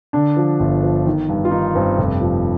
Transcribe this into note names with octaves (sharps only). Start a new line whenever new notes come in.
D3 D4
F3
G1
F3
D#3
G2
F4
D#3 D#4
G2 C4
F1
F3